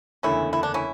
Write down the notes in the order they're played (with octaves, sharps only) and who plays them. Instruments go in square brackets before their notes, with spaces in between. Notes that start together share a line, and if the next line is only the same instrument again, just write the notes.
[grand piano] F#1 E2 D3 A3 [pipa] C#4 E4
[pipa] E4
D4
C#4 E4